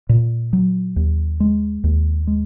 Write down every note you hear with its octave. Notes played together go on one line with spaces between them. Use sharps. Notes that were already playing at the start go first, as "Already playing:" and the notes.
A#2
F#3
D#2
G#3
D#2
G#3